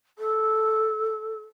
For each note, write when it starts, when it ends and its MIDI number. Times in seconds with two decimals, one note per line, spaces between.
0.19 1.43 69